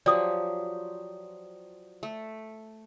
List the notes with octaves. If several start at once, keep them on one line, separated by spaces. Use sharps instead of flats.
F3 F#3 G4 D5 D#6
A3